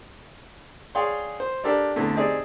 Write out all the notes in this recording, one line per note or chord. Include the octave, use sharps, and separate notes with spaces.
G#4 C#5 D5 F5 G5 C6
C5
D4 G4 A4 A#4 D5
E2 D3 A3 C4
C4 D#4 G4 G#4 D5